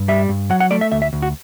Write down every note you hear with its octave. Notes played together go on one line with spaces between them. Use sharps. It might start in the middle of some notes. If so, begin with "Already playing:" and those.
Already playing: G2
G3 E5
G2
F#3 F#5
F#5
A3 D5
E5
D2 E5
E5
D2
F#4